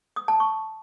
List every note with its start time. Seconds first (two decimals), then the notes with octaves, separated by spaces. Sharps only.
0.16 D#6
0.28 A5
0.40 C#6